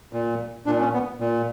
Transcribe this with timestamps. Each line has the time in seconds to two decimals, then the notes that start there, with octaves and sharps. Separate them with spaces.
0.13 A#2
0.66 A#2 D4
0.80 C#4
0.94 B3
1.20 A#2